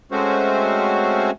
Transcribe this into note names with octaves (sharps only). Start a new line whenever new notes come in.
G#3 A3 C4 C#4 F#4 C5